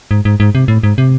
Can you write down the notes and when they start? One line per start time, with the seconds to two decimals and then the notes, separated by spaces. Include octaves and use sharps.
0.11 G#2
0.25 G#2
0.40 G#2
0.55 C3
0.68 A2
0.83 G#2
0.98 C3